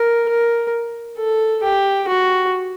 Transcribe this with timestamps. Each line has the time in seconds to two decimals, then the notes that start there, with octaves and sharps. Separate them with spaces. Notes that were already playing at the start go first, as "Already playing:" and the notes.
Already playing: A#4
0.29 A#4
1.18 A4
1.63 G4
2.08 F#4